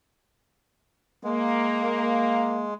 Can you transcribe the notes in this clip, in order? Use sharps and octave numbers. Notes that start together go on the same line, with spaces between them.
G#3 A#3